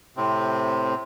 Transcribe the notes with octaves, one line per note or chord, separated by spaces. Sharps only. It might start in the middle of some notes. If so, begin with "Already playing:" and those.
A2 C3 C4